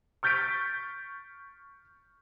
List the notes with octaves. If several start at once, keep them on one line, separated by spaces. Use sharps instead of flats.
C#6 F6 G6 A6 B6 D7